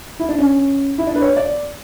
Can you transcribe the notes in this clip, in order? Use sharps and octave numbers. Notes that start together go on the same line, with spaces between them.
E4
D4
C#4
E4
D4
B4
C#5
D5